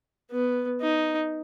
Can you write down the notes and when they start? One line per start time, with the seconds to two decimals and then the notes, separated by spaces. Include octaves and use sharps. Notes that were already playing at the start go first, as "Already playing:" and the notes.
0.32 B3
0.82 D#4